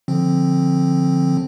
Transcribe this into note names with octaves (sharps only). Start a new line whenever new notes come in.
D3 F3 C4